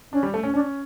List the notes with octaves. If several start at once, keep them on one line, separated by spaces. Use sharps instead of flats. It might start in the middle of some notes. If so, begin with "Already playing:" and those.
C#4 D4
G3
A3
C#4
C#4 D4